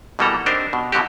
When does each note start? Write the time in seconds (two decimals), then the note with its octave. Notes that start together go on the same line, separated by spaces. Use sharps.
0.19 B2 E3 G3 A#3 A4 A#5
0.46 C4 D4 D#4 G4 A#4 C5
0.73 B2
0.92 B2 D3 F#3 F#4 G4